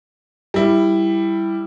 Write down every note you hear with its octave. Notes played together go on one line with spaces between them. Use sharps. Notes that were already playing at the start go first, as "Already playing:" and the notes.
G3 E4